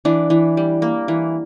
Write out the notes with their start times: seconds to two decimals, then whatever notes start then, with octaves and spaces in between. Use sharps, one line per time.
0.05 E3 D4
0.30 E3
0.57 G3
0.82 A#3
1.08 E3